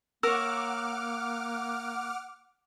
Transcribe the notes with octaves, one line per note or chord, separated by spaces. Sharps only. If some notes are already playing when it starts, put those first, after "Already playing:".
A#3 A#4 C#5 F#5 D6 E6 F6